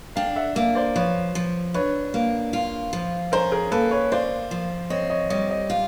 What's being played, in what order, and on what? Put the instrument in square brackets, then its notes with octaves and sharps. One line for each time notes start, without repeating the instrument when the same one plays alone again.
[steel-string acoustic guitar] D4 [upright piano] F5 G5
[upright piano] E5 F#5
[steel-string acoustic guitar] A#3 [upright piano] D5 E5
[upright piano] C5 D5
[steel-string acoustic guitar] F3 [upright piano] B4 C#5
[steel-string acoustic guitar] F3
[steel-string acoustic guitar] D4 [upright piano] B4 C#5
[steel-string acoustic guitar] A#3
F4
F3
[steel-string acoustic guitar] C#4 [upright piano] A#4 C5
[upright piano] G#4 A#4
[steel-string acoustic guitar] A#3 [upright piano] A4 B4
[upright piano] B4 C#5
[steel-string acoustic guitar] F4 [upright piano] C5 D5
[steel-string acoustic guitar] F3
[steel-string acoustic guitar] C4 [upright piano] C#5 D#5
[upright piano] C#5 D#5
[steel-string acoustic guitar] G3 [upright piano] C#5 D#5
[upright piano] C#5 D#5
[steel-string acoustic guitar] F4